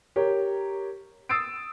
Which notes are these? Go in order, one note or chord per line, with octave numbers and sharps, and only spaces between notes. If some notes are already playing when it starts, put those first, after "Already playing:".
G4 A#4 C#5
D#6 E6 A6 C7 D7